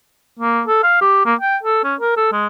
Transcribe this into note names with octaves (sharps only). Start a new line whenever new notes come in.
A#3
A4
F5
G4
A#3
G5
A4
C#4
A#4
A4
G#3